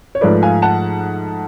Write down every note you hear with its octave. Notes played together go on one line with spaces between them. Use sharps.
C#5
G#2 F3 A3 B4 D5
F5 G#5
F#5 A5